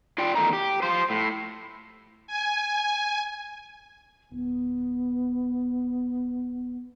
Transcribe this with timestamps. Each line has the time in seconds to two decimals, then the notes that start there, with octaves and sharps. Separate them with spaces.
0.18 F4 D5 G5
0.35 E2 D#3 A3 D#4 A#5
0.53 G4
0.83 F4 C5
1.10 A2
2.27 G#5
4.31 D1 B3